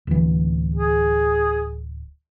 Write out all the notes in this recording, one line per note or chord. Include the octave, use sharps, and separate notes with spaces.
D1 E3
G#4